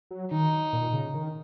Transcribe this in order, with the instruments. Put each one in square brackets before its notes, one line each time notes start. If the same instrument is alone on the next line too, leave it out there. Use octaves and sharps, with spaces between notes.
[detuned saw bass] F#3
[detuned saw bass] D#3 [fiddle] D#4
[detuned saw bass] A#2
C#3
D#3